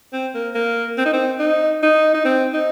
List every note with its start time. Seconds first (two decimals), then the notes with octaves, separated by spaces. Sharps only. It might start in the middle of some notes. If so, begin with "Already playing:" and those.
0.13 C4
0.34 A#3
0.55 A#3
0.98 C4
1.05 D#4
1.13 C4
1.39 D#4
1.83 D#4
2.14 D#4
2.25 C4
2.54 D#4